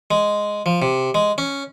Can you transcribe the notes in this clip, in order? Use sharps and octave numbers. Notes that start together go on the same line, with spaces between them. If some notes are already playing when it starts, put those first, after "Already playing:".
G#3
F3
C3
G#3
C#4